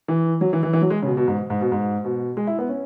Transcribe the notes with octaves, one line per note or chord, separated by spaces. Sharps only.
E3
F#3
E3
E3
E3
F#3
G#3
C#3
B2
B2
G#2
G#2
B2
G#2
B2
G#3
E4
B3
C#4